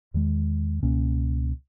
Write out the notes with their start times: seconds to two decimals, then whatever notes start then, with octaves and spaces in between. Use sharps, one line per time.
0.14 E2 D#3 G#3
0.82 C#2 B2 A#3 C#4